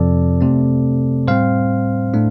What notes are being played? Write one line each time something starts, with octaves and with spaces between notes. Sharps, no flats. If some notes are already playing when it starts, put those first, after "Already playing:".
Already playing: F2 C3 F3 C4 A4 D5
C3 A3 C4
A2 G3 C4 C5 F5
A2 A3 D4